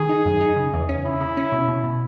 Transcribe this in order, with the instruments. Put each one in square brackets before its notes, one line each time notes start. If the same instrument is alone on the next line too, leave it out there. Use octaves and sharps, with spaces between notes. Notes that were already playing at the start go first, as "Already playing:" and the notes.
Already playing: [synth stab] D#3 [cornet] G#4
[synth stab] D#4
F#2
D#4
C#3
E2
C#4
[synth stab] C#3 [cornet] E4
[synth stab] C#3
C#4
B2
B2
B2